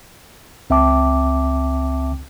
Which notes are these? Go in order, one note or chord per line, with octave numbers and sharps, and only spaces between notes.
C#2 C4 E5 G5 A5 D6